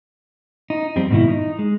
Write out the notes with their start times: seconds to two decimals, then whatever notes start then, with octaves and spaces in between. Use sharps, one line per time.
0.70 D#4
0.96 F2 G3 C4
1.11 G#2 B2 D#3 E4
1.28 D#4
1.59 G#3